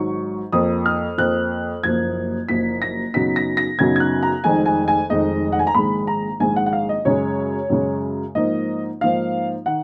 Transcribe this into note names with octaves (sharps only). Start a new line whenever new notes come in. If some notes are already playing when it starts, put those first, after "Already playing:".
Already playing: G#1 G#2 F#3 C#6
F2 F3 A#3 D#6
F6
F2 F3 A#3 F#6
F#1 F#2 F3 A#3 G#6
F#1 F#2 F3 A#3 B6
A#6
F#2 C#3 F#3 B3 D#4 B6
A#6
A#6
F#2 C#3 F#3 B3 D#4 G#6
G#6
F#6
A#5
F1 F2 D#3 G#3 D#4 G#5
G#5
G#5
F1 F2 D#3 G#3 D#4 D#5
F#5
G#5
A#5
A#1 G#2 D#3 G#3 B5
A#5
A#1 G#2 D#3 G#3 G#5
F#5
F#5
F5
D#5
F#2 C#3 G#3 C#5
F#2 C#3 G#3
G#2 F3 A#3 D#4 D#5
G#2 F3 A#3 D#4 F5
D#3 F#5